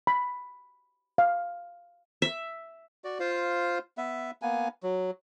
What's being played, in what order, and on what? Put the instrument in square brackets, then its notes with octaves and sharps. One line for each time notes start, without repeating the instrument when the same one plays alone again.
[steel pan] B5
F5
[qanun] E5
[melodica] F#4 D5
F4 C5 F5
B3 E5
A#3 B3 G#5
F#3